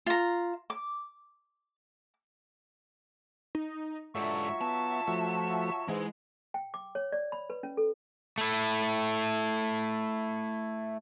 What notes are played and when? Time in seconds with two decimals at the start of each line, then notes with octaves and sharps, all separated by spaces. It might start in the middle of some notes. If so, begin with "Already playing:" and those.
0.06 F4 A#5
0.70 D6
3.55 D#4
4.15 G#2 F#3 D4 F4 A4 E5 C#6
4.61 B3 A5
5.08 F3 A3 F#4 E5
5.88 G#2 E3 G#3
6.54 G5
6.74 D6
6.95 C#5
7.12 D5
7.32 B5
7.50 B4
7.63 C#4
7.77 A4
8.38 A3 E4